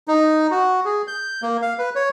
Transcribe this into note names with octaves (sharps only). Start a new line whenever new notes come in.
D#4
F#4
G#4
G6
A#3
F5
B4
C#5